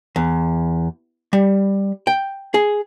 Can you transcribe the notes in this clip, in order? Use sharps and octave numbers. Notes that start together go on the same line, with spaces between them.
E2
G3
G5
G#4